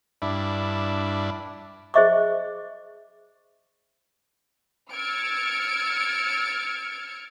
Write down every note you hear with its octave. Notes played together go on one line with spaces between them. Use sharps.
G2 D4 E4
G#4 C5 D#5 E5 C#6 D6
E6 F6 G#6 A6 C#7 D7